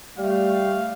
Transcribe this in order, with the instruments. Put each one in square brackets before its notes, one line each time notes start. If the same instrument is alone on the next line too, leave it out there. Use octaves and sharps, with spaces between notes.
[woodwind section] G3 A3 [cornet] F5